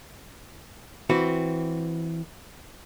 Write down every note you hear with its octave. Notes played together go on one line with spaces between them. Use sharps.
E3 C4 F#4